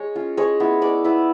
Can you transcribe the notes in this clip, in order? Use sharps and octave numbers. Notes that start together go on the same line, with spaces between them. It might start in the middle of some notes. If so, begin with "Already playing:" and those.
Already playing: G#3 C#5
C#4 F4
G#3 C#5
B3 E4
G#3 D5
B3 E4